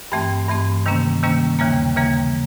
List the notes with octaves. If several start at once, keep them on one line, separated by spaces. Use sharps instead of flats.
G2 E3 A3 C4 G5
G2 E3 A3 C4
C3 D#3 G3 A#3 C#4
C3 D#3 G3 A#3 C#4
D#2 C#3 E3 G3 A#3 G5
D#2 C#3 E3 G3 A#3